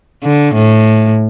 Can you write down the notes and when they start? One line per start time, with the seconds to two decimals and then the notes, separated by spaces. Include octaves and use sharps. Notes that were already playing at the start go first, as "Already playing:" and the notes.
0.24 D3
0.54 A2